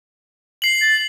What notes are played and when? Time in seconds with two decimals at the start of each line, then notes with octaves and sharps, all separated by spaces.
0.62 C7 F#7
0.81 A6